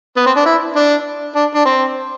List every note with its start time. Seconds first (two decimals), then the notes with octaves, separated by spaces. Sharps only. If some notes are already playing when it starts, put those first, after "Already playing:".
0.16 B3
0.26 C4
0.36 D4
0.45 E4
0.76 D4
1.35 D4
1.55 D4
1.65 C4